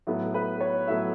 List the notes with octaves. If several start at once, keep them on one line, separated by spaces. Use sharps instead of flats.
A2 F#3 B3
B4
C#5
A2 F#3 B3 E5